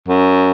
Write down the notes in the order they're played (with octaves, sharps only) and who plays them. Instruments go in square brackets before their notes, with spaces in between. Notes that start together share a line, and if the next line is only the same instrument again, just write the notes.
[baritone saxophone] F#2